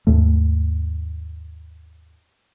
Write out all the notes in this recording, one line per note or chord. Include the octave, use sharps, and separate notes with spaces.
D#2 G#2 A3